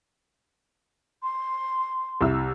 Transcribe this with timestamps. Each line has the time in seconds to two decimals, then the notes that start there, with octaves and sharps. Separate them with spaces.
1.22 C6
2.21 C2 E4 E6